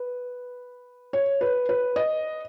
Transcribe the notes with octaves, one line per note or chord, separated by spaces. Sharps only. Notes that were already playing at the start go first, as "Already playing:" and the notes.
Already playing: B4
C#5
B4
B4
D#5